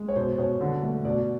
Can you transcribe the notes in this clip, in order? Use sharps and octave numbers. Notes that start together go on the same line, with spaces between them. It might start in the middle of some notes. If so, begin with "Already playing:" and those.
Already playing: G#3
C#5
B2 C5
B2 C#5
D3
A3
B2 D5